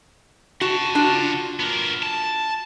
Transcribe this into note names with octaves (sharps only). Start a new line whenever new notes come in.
F#4 F#5 A5
D4 F4 F#4
B3 A#4
A5